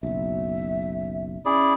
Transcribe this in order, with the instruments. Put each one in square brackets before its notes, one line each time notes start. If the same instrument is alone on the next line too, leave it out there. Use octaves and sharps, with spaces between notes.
[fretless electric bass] F#1 B1 [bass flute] E5
[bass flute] C#4 [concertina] E4 G#4 D5